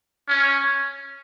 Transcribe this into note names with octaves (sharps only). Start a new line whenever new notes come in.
C#4